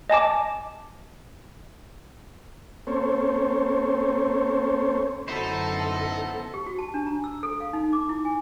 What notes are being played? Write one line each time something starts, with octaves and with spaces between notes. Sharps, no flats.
D#5 G#5 A5 D6
A#3 C4 C#4 A4 C5 C#5
F#2 A2 D3 B3 D#4 E4 A4 C5
G4
F#4
A5
D4
A#5
E6
A4
F5
D#4
D6
E4
G#5